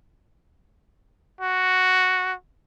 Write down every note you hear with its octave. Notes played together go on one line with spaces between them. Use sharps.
F#4